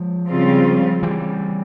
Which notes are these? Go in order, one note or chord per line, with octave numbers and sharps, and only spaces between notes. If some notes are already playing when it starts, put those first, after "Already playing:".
Already playing: F3 G#3
C#3 G3 C4 F4
E3 G3